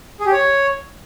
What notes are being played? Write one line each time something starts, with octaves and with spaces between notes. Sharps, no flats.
G#4
G4
C#5